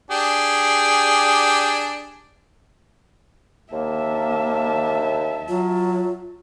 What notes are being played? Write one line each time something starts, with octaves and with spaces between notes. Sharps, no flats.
D4 G4 G#4
D#2 A#3 E5 A5
F#3 F4